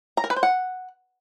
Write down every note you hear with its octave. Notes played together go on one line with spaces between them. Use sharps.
A#5
A#4
B4
C5
F#5